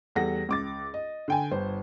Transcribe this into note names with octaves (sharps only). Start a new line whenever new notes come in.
E2 G3 A4 F#5 A#6
C#2 D6 A6
D#5
D3 G5 G#5
G1 C5